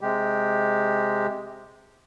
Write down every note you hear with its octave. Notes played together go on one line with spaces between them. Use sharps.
C3 G#3 G4